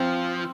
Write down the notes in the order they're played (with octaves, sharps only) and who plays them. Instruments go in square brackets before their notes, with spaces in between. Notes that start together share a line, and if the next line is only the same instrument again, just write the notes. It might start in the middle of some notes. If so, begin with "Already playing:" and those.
Already playing: [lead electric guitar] F3 [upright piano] C4